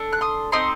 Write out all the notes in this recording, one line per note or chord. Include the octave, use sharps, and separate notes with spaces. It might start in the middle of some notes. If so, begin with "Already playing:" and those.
Already playing: D4 A4
F#6
C6 D#6
C4 D#4 A4 C6 D#6